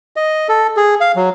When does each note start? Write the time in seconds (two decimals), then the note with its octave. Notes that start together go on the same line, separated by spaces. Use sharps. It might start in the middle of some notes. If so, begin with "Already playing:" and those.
0.16 D#5
0.49 A4
0.77 G#4
1.01 F5
1.16 F#3